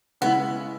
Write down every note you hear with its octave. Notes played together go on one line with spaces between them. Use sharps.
C#3 G#3 B3 C#4 E4